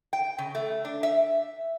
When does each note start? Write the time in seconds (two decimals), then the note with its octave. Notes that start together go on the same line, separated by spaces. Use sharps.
0.13 G5
0.38 C#3
0.55 A3
0.85 D4
1.03 E5